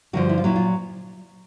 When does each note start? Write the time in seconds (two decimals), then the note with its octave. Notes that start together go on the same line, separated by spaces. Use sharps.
0.13 G2 D3 F3 F#3 F#4
0.29 E4
0.38 F4
0.44 A#2 F#3 E4
0.56 F4